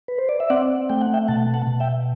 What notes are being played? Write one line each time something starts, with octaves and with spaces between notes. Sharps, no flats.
B4
C5
D5
E5
C4 D5 F#5
A3 G5
F#5
E5 G5
B2 F#5 A5
F#5 A5
B2
E5 G5